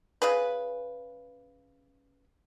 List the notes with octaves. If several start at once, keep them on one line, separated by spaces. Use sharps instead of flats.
C#3 G#4 B4